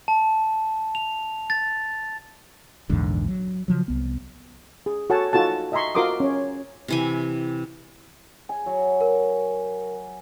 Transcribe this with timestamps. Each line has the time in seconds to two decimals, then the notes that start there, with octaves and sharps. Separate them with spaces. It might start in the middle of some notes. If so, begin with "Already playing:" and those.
0.08 A5
0.95 F7
1.50 A6
2.89 A#1 E2 G#2 D3
3.28 F#3
3.68 C#3 F3 F#3
3.88 C2 B3
4.86 G#4
5.10 F#4 A4 C#5 F#5 G#5 A5
5.33 D#4 F4 F#4 A4 A5
5.72 D#5 E5 G#5 A#5 C6 C#6
5.95 F4 F#4 A#4 C6 D6 D#6
6.20 C#4 C#5
6.88 C3 E3 G#5
8.49 G#5
8.66 F#3
9.01 A#4